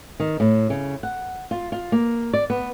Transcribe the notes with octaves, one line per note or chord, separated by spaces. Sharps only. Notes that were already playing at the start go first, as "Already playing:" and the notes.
D#3
A2
C#3
F#5
F4
F4
A#3
D5
B3